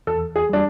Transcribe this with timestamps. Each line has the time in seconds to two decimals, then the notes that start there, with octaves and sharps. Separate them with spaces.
0.07 E2 A4
0.36 G#4
0.49 G3 D4